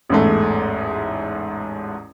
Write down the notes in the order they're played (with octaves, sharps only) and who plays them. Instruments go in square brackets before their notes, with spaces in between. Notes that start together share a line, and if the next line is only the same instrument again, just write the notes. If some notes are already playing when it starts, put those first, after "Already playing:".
[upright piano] A1 E2 G#2 A3